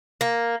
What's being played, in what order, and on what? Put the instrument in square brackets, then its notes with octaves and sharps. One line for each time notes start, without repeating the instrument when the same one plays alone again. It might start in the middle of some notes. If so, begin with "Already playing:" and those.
[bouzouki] A#3